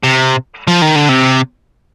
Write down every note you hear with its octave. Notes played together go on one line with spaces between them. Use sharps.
C3
F3
D#3
D3
C3